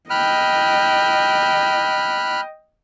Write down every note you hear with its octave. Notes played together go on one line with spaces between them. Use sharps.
D#5 G5 B5 F6 F#6